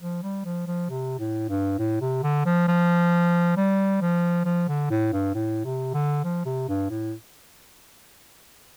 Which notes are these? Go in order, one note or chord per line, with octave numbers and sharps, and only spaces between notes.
F3
G3
F3
F3
C3
A2
G2
A2
C3
D3
F3
F3
G3
F3
F3
D3
A2
G2
A2
C3
D3
F3
C3
G2
A2